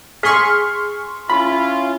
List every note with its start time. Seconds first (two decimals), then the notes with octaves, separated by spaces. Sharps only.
0.23 G#4 C6 C#6 F6 B6
1.30 C#4 E4 F4 B5